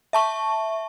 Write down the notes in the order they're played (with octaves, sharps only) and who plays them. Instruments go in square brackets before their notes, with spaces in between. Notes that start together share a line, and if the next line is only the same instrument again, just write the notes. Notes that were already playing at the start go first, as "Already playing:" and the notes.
[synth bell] E5 A5 C#6